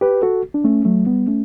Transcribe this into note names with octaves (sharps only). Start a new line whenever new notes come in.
G4 B4
F#4 A4
D4
A3 C#4
F#3 A3
G3 B3
A3 C#4